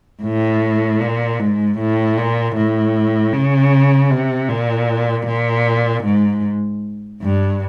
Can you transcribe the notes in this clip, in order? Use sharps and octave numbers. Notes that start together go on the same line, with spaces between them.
A2
A#2
G#2
A2
A#2
A2
C#3
C3
A#2
A#2
G#2
G2